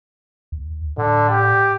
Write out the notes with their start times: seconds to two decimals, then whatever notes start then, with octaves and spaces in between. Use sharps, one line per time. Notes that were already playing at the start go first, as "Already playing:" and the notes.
0.52 D#2
0.98 A2 D3
1.30 G4